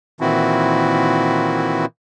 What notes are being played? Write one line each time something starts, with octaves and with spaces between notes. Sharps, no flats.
A#2 D#3 E3 C4 E4 F#4